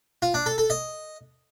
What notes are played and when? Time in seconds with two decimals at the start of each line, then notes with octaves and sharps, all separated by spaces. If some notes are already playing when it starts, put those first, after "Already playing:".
0.22 F4
0.34 D4
0.46 A4
0.58 A4
0.70 D#5